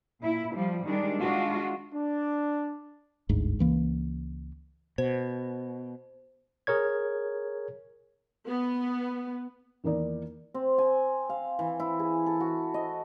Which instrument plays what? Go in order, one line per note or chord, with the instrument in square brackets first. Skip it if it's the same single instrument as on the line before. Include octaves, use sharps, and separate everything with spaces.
[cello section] A#2 E4
F3 G3
D#3 G3 G#3 D4
G#3 D4 F4 F#4
[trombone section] D4
[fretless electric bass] G1 D2 G#2
C#2 E3 A#3
[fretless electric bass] B2 [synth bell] C5
[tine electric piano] G#4 A#4 C#5 G#6
[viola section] B3
[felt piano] E2 D#3 E3 A#3 D#4 D5
[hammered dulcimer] C4
G#5
F5
E3
E4
G#4
A4
F#4
D#5